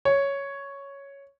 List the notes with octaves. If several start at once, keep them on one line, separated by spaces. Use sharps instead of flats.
C#5